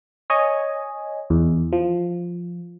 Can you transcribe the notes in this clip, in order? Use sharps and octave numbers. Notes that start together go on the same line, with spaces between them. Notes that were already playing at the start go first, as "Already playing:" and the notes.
C#5 D#5 G#5
E2
F3